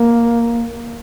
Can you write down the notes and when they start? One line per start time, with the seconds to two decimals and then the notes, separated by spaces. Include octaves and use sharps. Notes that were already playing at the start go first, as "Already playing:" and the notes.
Already playing: A#3